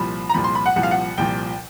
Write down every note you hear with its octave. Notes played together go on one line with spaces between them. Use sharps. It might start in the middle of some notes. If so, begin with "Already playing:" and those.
Already playing: C2 A#2 F3 B5
A#5
C2 A#2 F3 B5
C6
B5
F#5
C2 A#2 F3 F#5
F5
F#5
C2 A#2 F3 G5